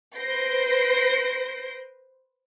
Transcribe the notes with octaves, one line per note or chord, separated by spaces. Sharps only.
B4 C5 G6 A#6 C7 D7